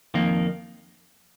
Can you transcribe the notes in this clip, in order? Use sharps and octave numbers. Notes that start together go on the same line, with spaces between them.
F2 D#3 A#3